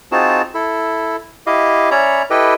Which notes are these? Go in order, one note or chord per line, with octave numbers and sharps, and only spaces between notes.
C4 D#4 F4 F#4 G#4 A5
E4 A4
E4 G4 D#5 F5
C#4 C#5 D5 E5 A#5 B5
E4 G4 A4 B4 D#5 G5